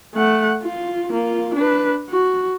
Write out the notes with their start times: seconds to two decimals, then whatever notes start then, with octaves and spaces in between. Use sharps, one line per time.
0.15 A3 F#5
0.63 F4
1.12 A#3 F4
1.54 D4 B4
2.10 F#4